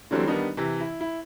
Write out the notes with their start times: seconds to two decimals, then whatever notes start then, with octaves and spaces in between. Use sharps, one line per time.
0.11 D3 E3 F#3 G3 A3 C4
0.27 D#3 G3 B3 D4 D#4
0.57 C3 E3
0.80 E4
1.01 E4